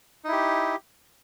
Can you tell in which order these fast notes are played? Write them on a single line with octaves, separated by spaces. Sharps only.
D#4 E4 G4